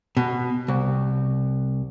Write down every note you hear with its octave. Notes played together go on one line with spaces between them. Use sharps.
B2
C2